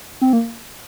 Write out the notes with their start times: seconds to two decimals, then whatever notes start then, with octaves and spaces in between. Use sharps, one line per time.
0.21 C4
0.33 A#3